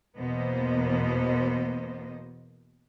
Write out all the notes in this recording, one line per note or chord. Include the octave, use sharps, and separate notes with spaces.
E2 B2 A#3 B3 C5 D#5